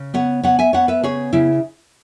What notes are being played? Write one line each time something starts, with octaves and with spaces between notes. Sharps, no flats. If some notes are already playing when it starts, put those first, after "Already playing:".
Already playing: C#3
B3 C#5 F#5
B3 C#5 F#5
E5 G#5
B3 C#5 F#5
B4 E5
C#3 G#4 C#5
C#3 E4